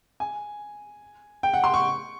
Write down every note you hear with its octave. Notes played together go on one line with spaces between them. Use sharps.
G#5
G5
F#5
C6
C#6